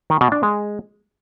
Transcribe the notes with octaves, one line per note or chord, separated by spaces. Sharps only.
D#3
B2
D4
G#3